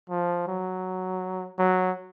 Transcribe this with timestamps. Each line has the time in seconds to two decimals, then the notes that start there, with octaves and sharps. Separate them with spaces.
0.10 F3
0.47 F#3
1.59 F#3